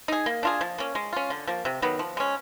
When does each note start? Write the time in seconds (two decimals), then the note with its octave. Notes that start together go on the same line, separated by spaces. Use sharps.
0.08 D#4 G#4
0.26 A#3
0.43 D4 F4 G#4
0.61 F3
0.78 A#3 C#4
0.95 G#3
1.13 C#4 F4
1.30 D3
1.47 F3 A#3
1.65 C3
1.82 D#3 F#3 B3
1.99 F3
2.17 G#3 C#4